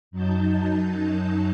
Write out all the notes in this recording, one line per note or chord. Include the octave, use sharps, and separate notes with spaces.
F#2 F#3 D#4 A5 G6